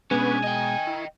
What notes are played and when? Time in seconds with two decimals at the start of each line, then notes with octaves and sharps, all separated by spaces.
0.11 B2 G#3 B3 C#4 D4 B4 G#5
0.43 D#5 G5 D#6
0.87 E4